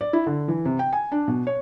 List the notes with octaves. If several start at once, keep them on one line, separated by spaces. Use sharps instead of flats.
D5
E4
D3
E3
C3
G5
G#5
D4
B2
C#5